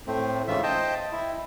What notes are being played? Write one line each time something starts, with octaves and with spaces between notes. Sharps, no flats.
A2 A3 C4
G#2 C#3 E3 F4 E5
C5 D#5 G5 A5
E4